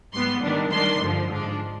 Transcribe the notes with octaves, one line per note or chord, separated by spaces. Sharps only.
G#2 G3 B3 C6
D#3 G3 D4
D#3 G3 D4 C6
G2 D3 F3
G#2 F3 G#3 D4